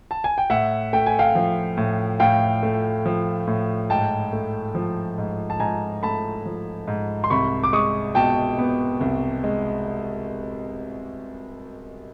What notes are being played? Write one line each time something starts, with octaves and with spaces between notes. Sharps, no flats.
A5
G#5
G5
A2 E5 F#5
A3 G5
G#5
F5 G5
F3
A2
A2 F5 G5
A3
F3
A2
G#2 G5 A5
A3
F3
G#2
A5
G#2 G#5 A#5
A3 A5 B5
F3
G#2
C6
C2 B5 C#6
D6
G#3 C#6 D#6
B2 G5 A5
B3
C2
G#3